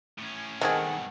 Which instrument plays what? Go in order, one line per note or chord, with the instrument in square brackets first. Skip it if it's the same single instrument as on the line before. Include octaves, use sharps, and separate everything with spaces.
[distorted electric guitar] A2 C#4
[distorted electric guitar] G2 B2 [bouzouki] D#3 A4 [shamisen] G#3 C4 G#4 [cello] F#5